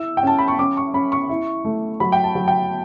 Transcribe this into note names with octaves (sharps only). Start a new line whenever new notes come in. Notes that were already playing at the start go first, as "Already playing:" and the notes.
Already playing: E4 E6
G5
C#4 A5
B5
C#6
C#4 D6
C#6
C#4 B5
C#6
E4
A3
F#3 B5
G5
A5
F#3
G5